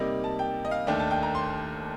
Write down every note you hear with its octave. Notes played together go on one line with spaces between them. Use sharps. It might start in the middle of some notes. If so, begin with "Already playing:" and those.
Already playing: C3 G3 A#3 D#4
A5
G5
D#5
F5
D#2 D#3 A3 D4 G5
A5
G5
A#5
C6